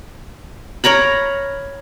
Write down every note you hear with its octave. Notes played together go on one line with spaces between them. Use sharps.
A#4 C#5 A#5 B5